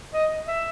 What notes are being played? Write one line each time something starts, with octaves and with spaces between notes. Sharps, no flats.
D#5
E5